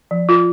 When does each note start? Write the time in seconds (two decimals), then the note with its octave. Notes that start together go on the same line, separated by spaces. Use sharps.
0.11 F3
0.29 F4